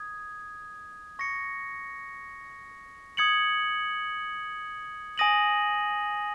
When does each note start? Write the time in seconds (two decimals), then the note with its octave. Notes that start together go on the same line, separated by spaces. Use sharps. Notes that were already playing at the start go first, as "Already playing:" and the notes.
Already playing: D#6 G#6
1.19 C#6 A#6 C#7
3.17 D#6 G#6 C#7 F#7
5.18 G#5 D#6 A#6 D#7 F#7